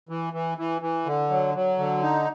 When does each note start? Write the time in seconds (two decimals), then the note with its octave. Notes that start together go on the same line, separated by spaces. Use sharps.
0.09 E3
0.33 E3
0.58 E3
0.82 E3
1.06 D3
1.30 F#3
1.54 F#3
1.78 D3
2.02 D#4